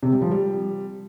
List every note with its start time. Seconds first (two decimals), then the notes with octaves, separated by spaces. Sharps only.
0.03 C3
0.12 G3
0.22 F3
0.31 G3